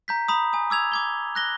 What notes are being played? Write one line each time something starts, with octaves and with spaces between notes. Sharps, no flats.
A#5 G6 B6
A#5 B5 D#6
G#5 D#6
D6 E6 G#6 F7
D6 G#6 G7
F#6 A#6 G7